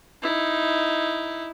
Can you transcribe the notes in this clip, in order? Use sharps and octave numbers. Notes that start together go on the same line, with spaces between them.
D#4 E4